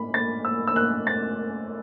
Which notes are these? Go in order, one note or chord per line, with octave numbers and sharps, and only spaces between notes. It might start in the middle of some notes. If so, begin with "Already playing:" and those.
Already playing: A2 A3 B5
A6
E6
E6
F#6
A6